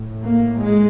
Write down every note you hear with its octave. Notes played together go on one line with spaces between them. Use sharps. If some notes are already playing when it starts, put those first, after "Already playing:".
Already playing: A2
A#3
G#3